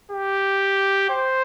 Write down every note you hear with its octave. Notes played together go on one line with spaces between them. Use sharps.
G4
C5